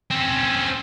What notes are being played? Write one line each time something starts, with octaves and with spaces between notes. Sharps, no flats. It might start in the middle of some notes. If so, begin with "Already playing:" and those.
C4 C#4